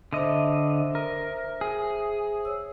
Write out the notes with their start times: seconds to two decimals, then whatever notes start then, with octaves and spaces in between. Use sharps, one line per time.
0.13 D3 C5 D#5 E5
0.95 A#4
1.61 G#4
2.45 C#5 E6